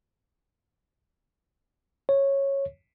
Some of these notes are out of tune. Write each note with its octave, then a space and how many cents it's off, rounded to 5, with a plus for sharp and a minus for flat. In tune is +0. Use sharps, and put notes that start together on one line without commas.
C#5 -10